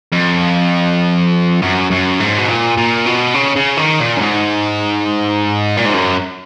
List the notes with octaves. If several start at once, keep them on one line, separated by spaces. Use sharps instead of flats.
F2
F#2
F#2
G#2
B2
A#2
A#2
B2
C#3
C#3
D#3
A#2
F#2
G#2
A#2
G#2
F#2